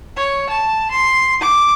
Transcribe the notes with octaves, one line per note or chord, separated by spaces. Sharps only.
C#5
A5
C6
D6